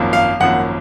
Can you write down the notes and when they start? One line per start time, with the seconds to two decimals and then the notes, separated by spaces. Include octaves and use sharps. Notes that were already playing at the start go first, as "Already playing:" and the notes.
Already playing: G#1 F#2 F3 A#3
0.13 F5
0.40 G#1 F#2 F3 A#3 F#5